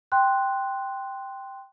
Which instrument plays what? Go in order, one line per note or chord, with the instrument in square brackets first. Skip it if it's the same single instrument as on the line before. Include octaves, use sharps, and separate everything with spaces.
[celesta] G5 C6 F#6